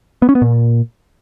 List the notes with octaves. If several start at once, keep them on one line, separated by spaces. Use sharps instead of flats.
B3
C#4
B3
A#2